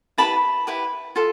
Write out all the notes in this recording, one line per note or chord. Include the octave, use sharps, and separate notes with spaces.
E4 G4 B4 A5 B5
E4 G4 B4
F4 A4